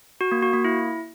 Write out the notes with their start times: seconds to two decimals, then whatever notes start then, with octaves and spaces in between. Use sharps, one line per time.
0.21 F#4
0.32 A#3
0.43 F#4
0.54 A#3
0.65 E4